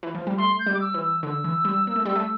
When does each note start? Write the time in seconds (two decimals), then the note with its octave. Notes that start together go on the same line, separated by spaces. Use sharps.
0.03 E3
0.15 F3
0.27 G3
0.37 A3 C6
0.59 G6
0.66 G3
0.74 D6
0.80 E6
0.94 E3
1.02 E6
1.23 D3 E6
1.44 E3
1.65 G3
1.87 A#3
1.96 A3
2.05 G3
2.15 A3